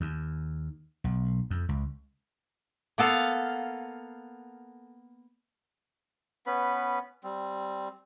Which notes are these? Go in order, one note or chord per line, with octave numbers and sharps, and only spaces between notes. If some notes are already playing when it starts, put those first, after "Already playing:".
D#2
B1
F2
C#2
A#3 B3 A4 F5
B3 C#4 B4 B5
G3 C4